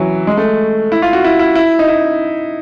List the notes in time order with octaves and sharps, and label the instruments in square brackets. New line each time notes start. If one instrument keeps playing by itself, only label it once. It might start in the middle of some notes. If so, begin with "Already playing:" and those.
Already playing: [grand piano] E3 F#3
G#3
A3
E4
F4
F#4
E4
E4
E4
D#4
E4